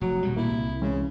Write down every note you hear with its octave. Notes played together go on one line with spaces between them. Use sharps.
F1 F#3
D#1 B2 G3
A#2 A#3 E4
C2
C#3 E3 G#3 C#4